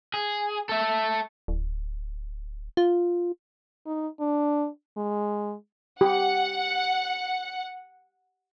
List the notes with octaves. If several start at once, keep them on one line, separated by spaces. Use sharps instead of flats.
G#4
A4 E5
D1
F4
D#4
D4
G#3
G4 F#5